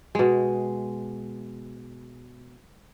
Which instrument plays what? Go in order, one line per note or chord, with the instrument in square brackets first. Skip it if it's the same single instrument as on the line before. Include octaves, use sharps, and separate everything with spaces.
[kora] B2 G#3